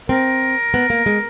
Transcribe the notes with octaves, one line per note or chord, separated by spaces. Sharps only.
C4 A#4
B3
A#3
G#3